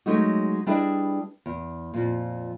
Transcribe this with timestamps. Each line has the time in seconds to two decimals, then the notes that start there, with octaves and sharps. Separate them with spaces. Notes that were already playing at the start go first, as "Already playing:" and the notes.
0.06 F#3 G#3 A3 C#4 D#4 F#4
0.67 G3 D4 E4 G#4 B4 D#5
1.46 E2
1.94 F2 A#2